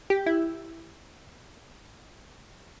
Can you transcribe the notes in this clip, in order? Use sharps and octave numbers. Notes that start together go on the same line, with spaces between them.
G4
E4